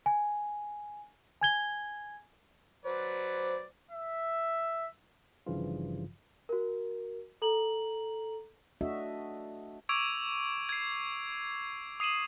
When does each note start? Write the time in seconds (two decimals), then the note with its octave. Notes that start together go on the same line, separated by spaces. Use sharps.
0.06 G#5
1.41 G#5 G#6 G7
2.85 F#3 B4 C5 D5
3.91 E5
5.46 G1 G2 C#3 E3 F3 F4
6.49 F#4 A#4
7.42 A4 A#5 F#7
8.81 A3 D4 F#4 A4 D#5 E5
9.89 C#6 D6 E6 G#6 D7 F7
10.69 G#6 C7
12.00 D#6 C7 D#7 E7 F#7